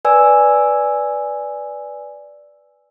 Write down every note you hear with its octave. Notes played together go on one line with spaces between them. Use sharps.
B4 D5 G#5 E6